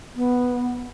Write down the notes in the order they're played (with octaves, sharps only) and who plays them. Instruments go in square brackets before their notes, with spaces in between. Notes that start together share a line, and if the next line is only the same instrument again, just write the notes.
[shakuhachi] B3